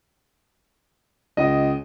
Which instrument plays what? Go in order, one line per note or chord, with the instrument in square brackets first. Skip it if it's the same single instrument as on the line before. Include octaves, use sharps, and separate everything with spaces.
[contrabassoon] C#2 [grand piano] D#5